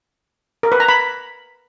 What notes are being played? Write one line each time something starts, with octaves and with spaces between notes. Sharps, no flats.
A#4
B4
A#5
B5